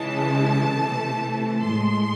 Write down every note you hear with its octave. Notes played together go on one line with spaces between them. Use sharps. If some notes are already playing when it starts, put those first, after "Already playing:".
Already playing: C#3 E3 G#3 A5
C3 E3 A3
A2 G#3 C6